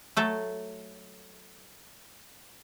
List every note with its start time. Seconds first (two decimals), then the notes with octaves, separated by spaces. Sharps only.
0.17 F#3 A3 A4